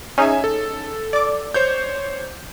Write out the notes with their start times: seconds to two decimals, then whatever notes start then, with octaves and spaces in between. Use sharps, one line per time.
0.18 C#4 D#4 G#4 E5 G#5
0.44 A4
1.13 D5 D6
1.54 C5 C#5 G6